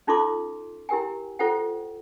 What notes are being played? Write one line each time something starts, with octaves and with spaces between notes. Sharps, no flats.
C#4 D#4 F4 A4 C6 D6
E4 G4 A#4 G5 G#5
F4 A4 C5 F#5 G5